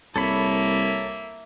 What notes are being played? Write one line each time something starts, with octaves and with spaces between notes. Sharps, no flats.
C2 A#3 A4 C#5 E5 B5